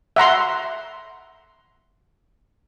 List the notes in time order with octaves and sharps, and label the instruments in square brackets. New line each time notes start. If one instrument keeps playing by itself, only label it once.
[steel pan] E5 F#5 A#5 C6